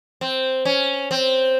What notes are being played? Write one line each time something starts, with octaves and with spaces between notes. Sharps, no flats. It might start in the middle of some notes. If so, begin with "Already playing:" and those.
C4
C#4
C4